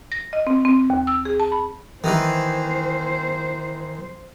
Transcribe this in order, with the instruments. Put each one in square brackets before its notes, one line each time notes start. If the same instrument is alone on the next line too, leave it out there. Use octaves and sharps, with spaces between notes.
[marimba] A#6
D#5
C4
C4
D#2
E6
G#4
A5
B5
[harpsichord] D#3 E3 [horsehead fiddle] C5